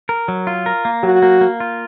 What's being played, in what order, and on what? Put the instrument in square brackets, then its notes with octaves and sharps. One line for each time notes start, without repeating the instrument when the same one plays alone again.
[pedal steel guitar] A#4
F#3
F4
A#4
A#3
[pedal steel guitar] F#3 [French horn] F#4
[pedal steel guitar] A#3
A#3
F4